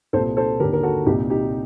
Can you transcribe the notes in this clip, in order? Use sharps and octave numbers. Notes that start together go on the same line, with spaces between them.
C2 A#2 A4 C5
A4 C5
D#2 D3 G4 A#4
A#4
F#4 A4
C2 A#2 D#4 G4
D#4 G4